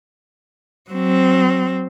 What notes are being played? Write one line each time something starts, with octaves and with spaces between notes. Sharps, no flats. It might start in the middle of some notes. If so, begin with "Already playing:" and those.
F#3 C4